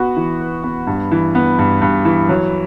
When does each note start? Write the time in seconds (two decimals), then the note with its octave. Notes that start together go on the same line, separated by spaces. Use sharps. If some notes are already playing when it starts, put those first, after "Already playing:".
Already playing: B3 F#4
0.16 E3
0.40 B4
0.63 B3
0.87 G2
1.12 E3
1.35 B3
1.59 G2
1.82 G2
2.05 E3
2.29 F#3